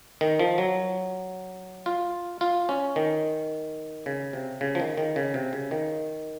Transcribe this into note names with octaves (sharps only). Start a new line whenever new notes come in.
D#3
F3
F#3
F4
F4
C#4
D#3
C#3
C3
C#3
F3
D#3
D#3
C#3
C3
C#3
D#3